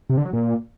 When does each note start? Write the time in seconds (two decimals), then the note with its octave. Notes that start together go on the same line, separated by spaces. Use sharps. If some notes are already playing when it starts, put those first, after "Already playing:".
0.09 C3
0.17 D3
0.25 F#3
0.33 A#2